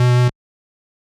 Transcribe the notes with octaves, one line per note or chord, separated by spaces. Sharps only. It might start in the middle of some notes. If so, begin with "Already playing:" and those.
Already playing: B2